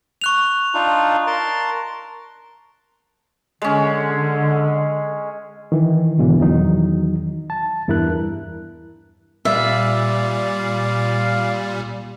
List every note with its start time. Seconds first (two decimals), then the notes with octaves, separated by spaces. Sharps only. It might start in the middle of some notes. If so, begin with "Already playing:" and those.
0.21 C#6 F#6 F7
0.74 D4 D#4 F4
1.27 A#4 A5 C6
3.62 D3 G#3 C#4
5.72 D#3 E3
6.18 E2 G#2 B2 D3 E3
6.40 E2 D#3 F#3 D#4
7.50 A5
7.88 E2 G2 E4 A#4 F#6
9.45 A#2 G3 D5 E5 F5